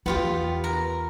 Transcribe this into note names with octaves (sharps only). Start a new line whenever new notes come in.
E2 B3 F4 G4
A#4